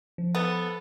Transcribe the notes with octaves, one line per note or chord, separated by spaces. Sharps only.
F3
B3 A4